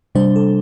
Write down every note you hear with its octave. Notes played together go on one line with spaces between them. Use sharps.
C3 G3 D4 C5
A4